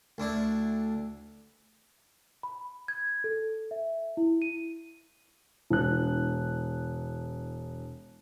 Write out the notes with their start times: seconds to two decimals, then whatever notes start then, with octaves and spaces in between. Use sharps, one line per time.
0.18 D2 D4 E4
2.43 B5
2.88 G#6
3.24 A4
3.71 E5
4.17 E4
4.42 D#7
5.70 E1 F#6